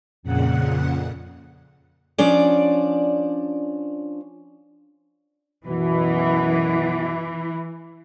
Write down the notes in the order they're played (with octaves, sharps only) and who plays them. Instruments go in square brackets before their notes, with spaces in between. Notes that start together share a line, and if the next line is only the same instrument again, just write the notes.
[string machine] F2 A#2 C#3 F#5
[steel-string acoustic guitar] F3 C#4 D4 D5
[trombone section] F#2 B2 [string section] E3